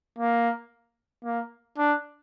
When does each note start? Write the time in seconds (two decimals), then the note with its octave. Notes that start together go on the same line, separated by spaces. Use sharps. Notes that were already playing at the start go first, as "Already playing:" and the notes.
0.19 A#3
1.24 A#3
1.78 D4